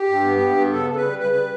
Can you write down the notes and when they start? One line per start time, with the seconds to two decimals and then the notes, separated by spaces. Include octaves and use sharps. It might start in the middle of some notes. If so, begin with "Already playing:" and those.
Already playing: G4
0.09 G2
0.24 B3
0.41 G2
0.56 B3
0.72 C#3 A4
0.88 C#3 A4
0.96 B4
1.04 G3
1.19 C#3 B4
1.35 G3